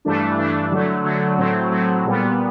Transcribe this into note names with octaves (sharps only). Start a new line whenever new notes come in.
G2 E3 A3 D4
G2 E3 A3 D4
D3 F#3 A3
D3 F#3 A3
A2 F#3 A3 C4
A2 F#3 A3 C4
A#2 G3 B3